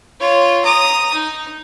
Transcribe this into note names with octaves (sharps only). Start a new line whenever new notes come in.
F4 C#5
A#5 D#6
D#4